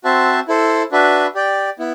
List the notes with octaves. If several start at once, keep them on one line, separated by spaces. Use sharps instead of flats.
C4 F#4 C5 E5 A5
E4 A4 C5
D4 F#4 B4 E5
G4 D5 G5
B3 E4